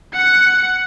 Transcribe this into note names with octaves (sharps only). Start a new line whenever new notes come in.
F#5 C#7